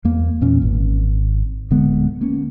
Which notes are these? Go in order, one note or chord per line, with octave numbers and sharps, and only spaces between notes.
E2 A#3
E2 A#2 C#4
G#1
D1 D3 G#3 B3
A#3 C#4